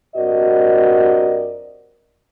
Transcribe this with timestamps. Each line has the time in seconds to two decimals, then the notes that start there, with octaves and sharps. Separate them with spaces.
0.16 G2 C4 F#4 A#4 D5 D#5